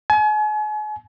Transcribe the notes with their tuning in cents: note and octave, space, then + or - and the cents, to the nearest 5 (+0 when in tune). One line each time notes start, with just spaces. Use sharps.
G#5 +40